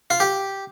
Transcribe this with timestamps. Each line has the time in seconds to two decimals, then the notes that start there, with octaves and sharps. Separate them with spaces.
0.10 F4
0.20 G4